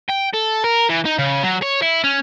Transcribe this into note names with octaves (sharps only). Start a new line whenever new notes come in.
G5
A4
A#4
E3
D#4
C#3
F#3
C#5
E4
C#4